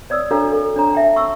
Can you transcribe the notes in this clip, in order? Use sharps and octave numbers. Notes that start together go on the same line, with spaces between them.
C#5 D5 D#6 E6
D4 F#4 A4 C#5 F5 A#5
A4
D4 C#5 A#5
E5 G5 A5
C#6 E6